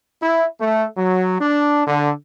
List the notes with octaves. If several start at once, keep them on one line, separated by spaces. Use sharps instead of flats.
E4
A3
F#3
D4
D3